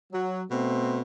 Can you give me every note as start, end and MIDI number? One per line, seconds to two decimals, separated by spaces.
0.13 0.43 54
0.51 1.00 47
0.51 1.00 57
0.51 1.00 60